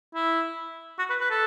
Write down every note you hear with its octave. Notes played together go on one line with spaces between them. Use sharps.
E4
F#4
B4
B4
A4